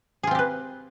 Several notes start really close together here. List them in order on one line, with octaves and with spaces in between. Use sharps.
G#4 F4 C4 G4 B4